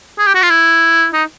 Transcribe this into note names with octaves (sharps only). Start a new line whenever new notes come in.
G#4
G4
F#4
F4
E4
D#4